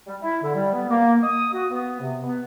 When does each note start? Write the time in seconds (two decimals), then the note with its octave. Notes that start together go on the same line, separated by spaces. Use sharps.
0.07 G3
0.22 E4
0.42 D3
0.54 G3
0.73 B3
0.89 A#3
1.23 D#6
1.53 F#4
1.70 B3
2.00 C3
2.24 B3